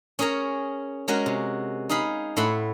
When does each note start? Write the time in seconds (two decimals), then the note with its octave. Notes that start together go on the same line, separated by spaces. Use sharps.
0.19 C#4 G#4 A#4 C#5 A#5
1.08 G#3 C#4 F#4 A#4
1.26 C3
1.89 D#4 G#4 F5 B5
2.37 A2 E5 F#5 B5 C6